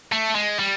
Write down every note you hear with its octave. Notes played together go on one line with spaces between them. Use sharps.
A3
G#3
G3